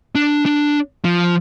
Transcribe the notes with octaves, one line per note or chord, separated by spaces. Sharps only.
D4
D4
F3